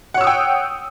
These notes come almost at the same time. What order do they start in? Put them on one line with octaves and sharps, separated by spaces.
F#5 C#5 E6 D#6 G5